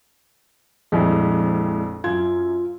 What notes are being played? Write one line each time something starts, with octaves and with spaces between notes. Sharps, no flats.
A#1 F2 G3 G#3 E4
F#2 F4 G#6